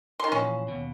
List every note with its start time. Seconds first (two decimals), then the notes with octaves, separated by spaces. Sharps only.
0.20 D#3 C6
0.32 A#2 E3 F3 C#4
0.68 D#2 B2